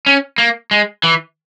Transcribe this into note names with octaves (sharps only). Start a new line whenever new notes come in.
C#4
A#3
G#3
E3